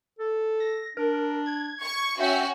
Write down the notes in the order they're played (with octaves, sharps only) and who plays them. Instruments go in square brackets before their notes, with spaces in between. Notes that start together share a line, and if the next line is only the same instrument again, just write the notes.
[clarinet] A4
[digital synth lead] A#6
[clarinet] D4 [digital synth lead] A#4
[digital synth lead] G#6
[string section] C#6
[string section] C#4 F#4 [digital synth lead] E5 [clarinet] G5